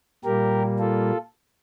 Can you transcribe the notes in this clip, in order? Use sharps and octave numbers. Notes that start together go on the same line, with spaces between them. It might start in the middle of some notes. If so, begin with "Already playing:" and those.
A#2 G3 A#3 G4 A#4
F4 A4